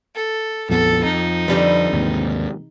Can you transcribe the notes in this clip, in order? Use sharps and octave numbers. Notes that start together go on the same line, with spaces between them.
A4
A#1 F2 B3 A4
F2 D#4
F2 D3 G3 B4
D#2 G#2 C3